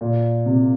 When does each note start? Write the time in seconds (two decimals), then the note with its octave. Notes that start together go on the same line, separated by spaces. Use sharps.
0.01 A#2
0.46 C3